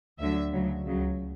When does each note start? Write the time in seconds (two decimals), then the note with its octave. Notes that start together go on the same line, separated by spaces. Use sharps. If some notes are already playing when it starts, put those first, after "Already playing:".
0.19 D2 D3 F#3 E5
0.52 D2 C#3 F#3
0.85 C#2 C#3 F#3